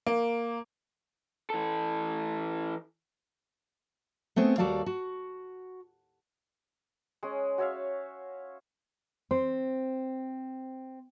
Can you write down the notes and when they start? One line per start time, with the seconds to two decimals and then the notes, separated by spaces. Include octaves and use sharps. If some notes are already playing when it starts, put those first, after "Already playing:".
0.07 A#3
1.50 E3 A4
4.36 A3 B3 C4 G#4
4.58 D#2 G3 F#4 A4 D5 F5
4.86 F#4
7.23 G#3 C#4
7.58 F#4 C#5 E5 F5
9.31 C4 C5